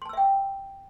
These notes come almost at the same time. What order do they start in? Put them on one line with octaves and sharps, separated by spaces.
C6 A5 E6 E5 G5